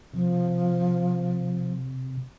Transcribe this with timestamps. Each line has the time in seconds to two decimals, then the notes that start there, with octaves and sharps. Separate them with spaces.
0.14 C3 F3